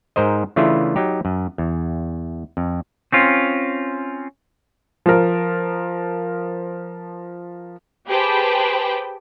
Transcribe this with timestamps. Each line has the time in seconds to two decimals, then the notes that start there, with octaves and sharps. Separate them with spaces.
0.16 G#2 A#4 C5 D#5
0.56 C#3 E3 A3 D4 E4 F4
0.96 F#3 D#4 G4
1.25 F#2
1.58 E2
2.57 F2
3.12 C4 C#4 F4
5.06 F3 A#4
8.07 G4 G#4 B4 C5 G5 A5